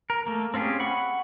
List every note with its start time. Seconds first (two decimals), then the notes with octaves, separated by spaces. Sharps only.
0.10 A#4
0.27 A3 A#3
0.54 C4 C#4 F4 G4 G#4
0.80 F#5 B5 C#6